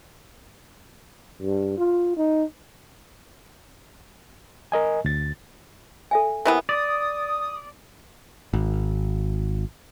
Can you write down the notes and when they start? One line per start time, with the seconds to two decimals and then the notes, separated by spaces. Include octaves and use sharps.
1.42 G2
1.78 F4
2.17 D#4
4.72 A#4 D#5 G#5
5.04 D2 A6
6.11 A4 E5 G#5
6.45 C3 E3 B3 A#4
6.69 D5 D#6
8.53 G#1